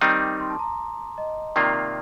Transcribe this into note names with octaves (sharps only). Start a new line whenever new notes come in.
D#3 G3 C4 D#4 D#6
D6
C6
A5
A#5
D#5
C3 D#3 A#3 F4 D5